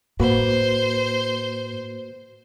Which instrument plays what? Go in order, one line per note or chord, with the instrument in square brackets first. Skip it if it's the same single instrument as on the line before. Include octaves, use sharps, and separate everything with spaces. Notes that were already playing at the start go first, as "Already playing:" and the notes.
[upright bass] A2 [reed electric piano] A#3 F#4 B4 [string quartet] C5